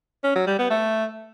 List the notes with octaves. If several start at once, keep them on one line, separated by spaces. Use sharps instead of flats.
C#4
F#3
G3
B3
A3